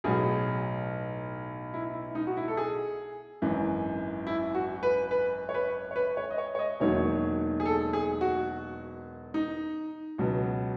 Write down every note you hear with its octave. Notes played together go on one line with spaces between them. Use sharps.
B1 A2 F#3 G#4
E4
E4
D#4
F#4
E4
A4
G#4
G#1 F#2 E3
E4
F#4
B4
B4
C#5
B4
C#5
B4
C#5
D#5
C#5
C#5
D#5
E1 D#2 D#3 F#3 C#5
G#4
A4
G#4
F#4
D#4
C#2 B2 F#3